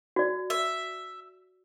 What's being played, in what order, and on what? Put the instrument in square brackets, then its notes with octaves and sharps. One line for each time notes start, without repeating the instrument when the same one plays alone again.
[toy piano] F#4 D5
[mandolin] E5